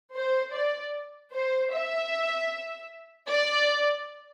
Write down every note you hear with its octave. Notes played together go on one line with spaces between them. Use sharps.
C5
D5
C5
E5
D5